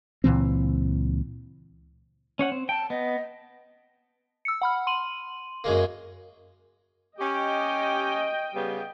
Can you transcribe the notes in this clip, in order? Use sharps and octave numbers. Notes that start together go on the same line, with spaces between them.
C#2 A#2 E3 C4
C#4 C#5 F#5
C4
G5 A5
B3 D#5
E6 C#7
F#5 B5 F6
C6 D#7 F#7
F#2 G#3 A#3
C#4 G4 D#5 G5
C#3 G3 B3